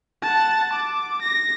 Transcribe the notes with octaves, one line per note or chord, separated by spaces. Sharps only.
F#5 A5
D6
A#6